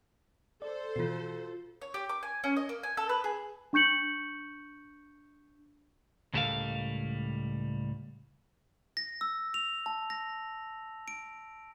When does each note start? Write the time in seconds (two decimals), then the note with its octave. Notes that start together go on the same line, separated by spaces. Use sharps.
0.62 A4 C5 D5
0.96 B2 E3 F4 F#4 C7
1.82 C#5
1.94 G4
2.09 D6
2.23 G#5
2.44 C#4
2.57 D#5
2.69 A#3
2.83 G#5
2.97 A4
3.09 B4
3.24 G#4
3.73 D4 C#6 G6 C#7 F#7
6.33 C#2 A2 G3 A4 A#4 F5
8.97 A#6
9.21 E6
9.54 F7
9.86 A5
10.10 A#6
11.08 D7